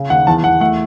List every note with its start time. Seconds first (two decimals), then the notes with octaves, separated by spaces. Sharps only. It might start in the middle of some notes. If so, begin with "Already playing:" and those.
Already playing: C#3
0.10 D#2 F#5
0.27 E2 A5
0.43 E2 F#5
0.60 A3 F#5